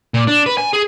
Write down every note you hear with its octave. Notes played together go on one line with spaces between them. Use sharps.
A#2
D4
B4
G#5
G#4